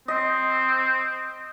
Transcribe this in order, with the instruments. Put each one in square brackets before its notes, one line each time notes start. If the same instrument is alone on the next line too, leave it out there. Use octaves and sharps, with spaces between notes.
[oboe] C4 [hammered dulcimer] D#5